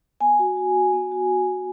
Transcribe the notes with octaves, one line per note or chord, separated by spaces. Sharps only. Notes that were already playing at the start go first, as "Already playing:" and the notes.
B3 G#5
F#4
F#4
B3
B3
F#4